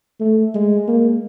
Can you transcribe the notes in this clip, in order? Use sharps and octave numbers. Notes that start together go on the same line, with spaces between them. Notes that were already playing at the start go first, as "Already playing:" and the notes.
A3
G#3
A#3